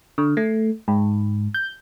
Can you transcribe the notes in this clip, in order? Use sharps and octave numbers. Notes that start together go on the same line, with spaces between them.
D3
A3
G#2
G6